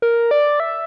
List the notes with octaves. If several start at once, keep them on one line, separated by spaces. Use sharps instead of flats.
A#4
D5
E5